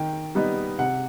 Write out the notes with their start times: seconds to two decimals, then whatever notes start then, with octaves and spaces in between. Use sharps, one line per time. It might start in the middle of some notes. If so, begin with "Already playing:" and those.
Already playing: D#3 G5
0.35 G3 B3 D#4
0.79 C3 F#5